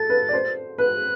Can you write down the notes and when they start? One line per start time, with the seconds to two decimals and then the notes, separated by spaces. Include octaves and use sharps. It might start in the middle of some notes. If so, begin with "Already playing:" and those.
Already playing: A4 A6
0.10 B4
0.29 D5
0.34 C5
0.78 B4 F#6